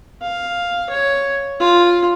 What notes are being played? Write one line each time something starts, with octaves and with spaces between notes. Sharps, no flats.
F5
C#5
F4